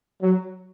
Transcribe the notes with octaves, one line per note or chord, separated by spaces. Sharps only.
F#3